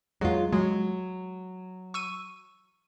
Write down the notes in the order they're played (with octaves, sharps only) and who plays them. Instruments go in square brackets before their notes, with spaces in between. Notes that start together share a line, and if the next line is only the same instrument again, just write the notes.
[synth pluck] E2 F#3 [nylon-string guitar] G#3 F4
[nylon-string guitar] F#3 [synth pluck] G#3
[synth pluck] C#6 E6 D#7